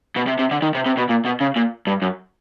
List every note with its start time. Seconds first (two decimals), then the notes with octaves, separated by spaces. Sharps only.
0.17 B2
0.28 C3
0.39 C3
0.51 D3
0.62 D#3
0.75 C3
0.86 C3
0.97 B2
1.09 A#2
1.25 B2
1.41 C#3
1.56 A#2
1.87 G2
2.02 F#2